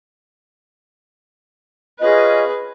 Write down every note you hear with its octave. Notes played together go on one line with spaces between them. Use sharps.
C#4 F4 G#4 B4 D#5